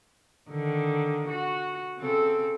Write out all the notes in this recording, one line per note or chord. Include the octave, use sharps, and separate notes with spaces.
D3 D#3
F#4
C#3 C4 A4